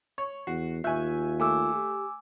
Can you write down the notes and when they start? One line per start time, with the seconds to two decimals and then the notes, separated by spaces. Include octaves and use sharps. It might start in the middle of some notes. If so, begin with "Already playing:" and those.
0.18 C#5 C#6
0.47 E2 F#4 C7
0.84 D#2 F4 E5 G#5 C#6 F#6 G6
1.40 A3 G#5 D6 E6
1.75 G4